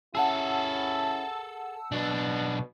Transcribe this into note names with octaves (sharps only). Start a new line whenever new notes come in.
C#4 E4 G#4 A4 F#5 A5 E6
B1 B2 D4